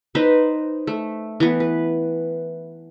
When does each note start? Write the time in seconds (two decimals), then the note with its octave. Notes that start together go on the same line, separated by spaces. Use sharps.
0.15 D#4 B4 C5
0.87 A3
1.40 E3 B3
1.60 B4